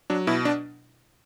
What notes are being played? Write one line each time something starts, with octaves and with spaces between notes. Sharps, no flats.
F#3 D4
B2 E4
D4